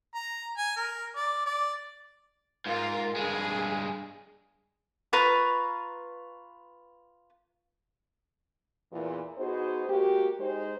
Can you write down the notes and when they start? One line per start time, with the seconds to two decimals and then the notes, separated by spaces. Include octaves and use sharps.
0.14 A#5
0.58 G#5
0.76 A#4
1.16 D5
1.46 D5
2.66 G#2 F4 A#4
3.16 G2 G#3 G#4
5.13 F4 B4 A#5 C#6
8.92 E2 A#2
9.38 B3 D#4 F#4 G#4 C5
9.89 G#3 A#3 F#4 G4
10.40 G#3 D#4 C5